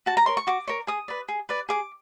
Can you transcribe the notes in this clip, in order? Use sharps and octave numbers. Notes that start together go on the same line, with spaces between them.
F#4 A5
A#5
A#4 C#5 C6
C#6
F#4 D6
A#4 C#5
G#4 D#6
B4 D5
G#4
B4 D5
G#4 D6